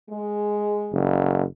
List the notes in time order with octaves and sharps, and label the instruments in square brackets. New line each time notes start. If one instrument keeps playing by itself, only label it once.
[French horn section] G#3
[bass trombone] F#1